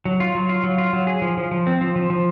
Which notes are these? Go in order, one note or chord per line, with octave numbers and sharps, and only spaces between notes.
F#3
F4
F#3
F4
F#3
F4
F#3
G#4
F3
F3
F3
C4
F3
F3
F3